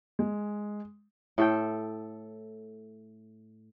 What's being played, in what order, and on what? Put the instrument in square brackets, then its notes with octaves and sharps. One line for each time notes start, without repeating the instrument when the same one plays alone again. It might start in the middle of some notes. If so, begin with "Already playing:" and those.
[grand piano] G#3
[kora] A2 A4 G5